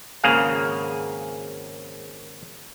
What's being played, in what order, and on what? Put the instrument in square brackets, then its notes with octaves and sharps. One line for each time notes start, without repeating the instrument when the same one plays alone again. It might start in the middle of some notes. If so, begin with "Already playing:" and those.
[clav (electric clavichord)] G#1 C#3 A#3 G#4 F5